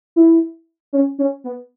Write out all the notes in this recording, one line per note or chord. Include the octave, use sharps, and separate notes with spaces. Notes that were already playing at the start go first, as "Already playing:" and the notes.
E4
C#4
C#4
B3